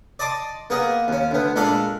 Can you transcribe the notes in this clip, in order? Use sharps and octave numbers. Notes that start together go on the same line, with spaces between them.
D5 D#5 A5 C6 D6
A#3 B3 G#4 D#5
D#2 C#4
D2 B3
A#2 G#3 D4 A4 F5 B5